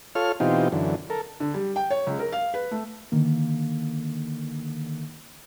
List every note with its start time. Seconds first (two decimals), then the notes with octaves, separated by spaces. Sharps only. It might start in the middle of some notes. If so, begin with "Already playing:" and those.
0.15 F4 A4 C#5 F6
0.40 B2 E3 C4 D#4 F4 G4
0.72 F#2 D3 E3
1.10 A4 A#4
1.40 D3
1.54 G3
1.76 G5
1.90 C#5
2.07 C#2
2.19 A#4
2.32 F5
2.54 B4
2.71 A3
3.12 D3 D#3 A#3